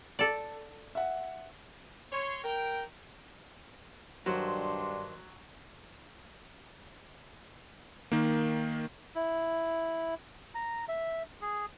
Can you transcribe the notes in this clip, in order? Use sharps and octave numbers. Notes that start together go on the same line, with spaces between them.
A4 D5
E5 F#5
C#5 C6
A#4 G5
G2 D#3 F#3 D4 C5 C6
D#3 A#3
E4
A#5
E5
G#4